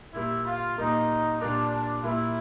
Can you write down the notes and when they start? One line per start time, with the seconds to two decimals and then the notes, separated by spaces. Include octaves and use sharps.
0.14 A#2 G3 A#3 E4
0.46 F4
0.78 A#2 G3 A#3 D#4
1.40 A#2 G3 A#3 D4
2.03 A#2 G3 A#3 E4